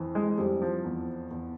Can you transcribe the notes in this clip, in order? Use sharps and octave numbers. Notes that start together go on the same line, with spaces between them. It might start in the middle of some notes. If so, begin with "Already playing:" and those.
Already playing: F2 E3
G#3
F2 G3
F3
E2
E2